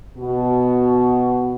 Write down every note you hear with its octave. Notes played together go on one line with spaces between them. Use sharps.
B2 F#4